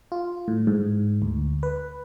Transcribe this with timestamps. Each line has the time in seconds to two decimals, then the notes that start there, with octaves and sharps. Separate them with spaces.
0.12 F4
0.48 A2
0.67 G#2
1.22 D2
1.63 B4